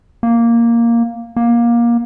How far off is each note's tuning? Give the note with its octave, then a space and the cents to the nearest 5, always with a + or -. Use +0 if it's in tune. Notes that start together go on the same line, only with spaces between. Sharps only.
A#3 +0
A#3 +20